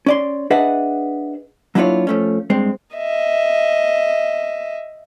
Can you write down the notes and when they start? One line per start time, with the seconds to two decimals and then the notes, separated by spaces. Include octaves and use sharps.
0.06 C#4 D5 C6
0.50 D4 G#4 B4 D#5 E5 F#5
1.75 F#3 A#3 D4 E4 F4 C#5
2.07 F3 A3 C#4
2.50 G2 G#3 C4
2.96 D#5 E5